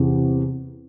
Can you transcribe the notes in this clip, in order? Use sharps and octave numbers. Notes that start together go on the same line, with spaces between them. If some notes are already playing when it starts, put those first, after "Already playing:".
Already playing: E2 C3 E3